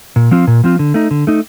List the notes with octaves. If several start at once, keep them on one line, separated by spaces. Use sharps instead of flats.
A#2
F3 C4 F4
A#2
F3 C4 F4
D3
A3 D#4
D3
A3 D#4